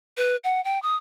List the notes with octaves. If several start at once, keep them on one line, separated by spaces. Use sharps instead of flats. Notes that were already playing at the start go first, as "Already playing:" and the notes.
B4
F#5
G5
D#6